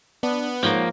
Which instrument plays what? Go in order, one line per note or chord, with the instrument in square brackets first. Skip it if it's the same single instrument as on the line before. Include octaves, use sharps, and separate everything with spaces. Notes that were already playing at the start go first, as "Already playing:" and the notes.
[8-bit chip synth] B3 [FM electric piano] D4
[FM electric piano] G#2 C#5 F#5 [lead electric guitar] F3 A#3